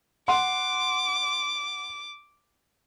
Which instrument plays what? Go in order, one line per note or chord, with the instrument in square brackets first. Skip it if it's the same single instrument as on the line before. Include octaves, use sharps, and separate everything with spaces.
[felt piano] F#5 C6 [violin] D6